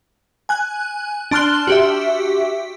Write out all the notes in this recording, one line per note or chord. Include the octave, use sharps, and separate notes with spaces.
G#5 F#6
D4 A5 C6 F6 F#6 G7
F#4 G4 E5